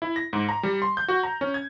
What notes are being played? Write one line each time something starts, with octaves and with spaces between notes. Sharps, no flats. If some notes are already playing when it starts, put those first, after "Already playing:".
E4
A#6
G#2
A#5
G3
C6
G6
F#4
A#5
C#4
G#6